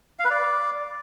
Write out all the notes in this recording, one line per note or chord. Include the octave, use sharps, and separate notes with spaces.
F5
B4
D5